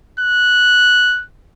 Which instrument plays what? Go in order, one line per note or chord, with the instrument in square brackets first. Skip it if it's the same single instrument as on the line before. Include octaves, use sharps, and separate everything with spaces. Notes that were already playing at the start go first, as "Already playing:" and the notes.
[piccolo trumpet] F#6